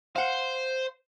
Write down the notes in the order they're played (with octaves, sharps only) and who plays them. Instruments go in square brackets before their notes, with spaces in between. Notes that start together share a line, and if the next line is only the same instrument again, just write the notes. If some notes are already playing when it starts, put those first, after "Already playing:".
[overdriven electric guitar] C5 [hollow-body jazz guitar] F5 F#5